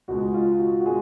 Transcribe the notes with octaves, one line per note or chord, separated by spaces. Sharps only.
C#2 B2 G#3 F#4
F4
F#4
F#4
B2 G#3 G#4